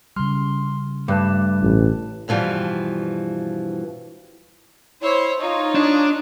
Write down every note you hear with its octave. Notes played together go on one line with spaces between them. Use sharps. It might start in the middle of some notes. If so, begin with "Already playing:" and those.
C#3 G3 C6 F6
G2 A3 B4 A5
A1
G2 B2 E3 F3 G3
E4 C5 C#5
D#4 F4 C#5
D4